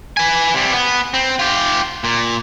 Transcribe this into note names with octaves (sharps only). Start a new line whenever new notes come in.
B4 G#5
C3 G3
B3
C4
F4 G4
A#2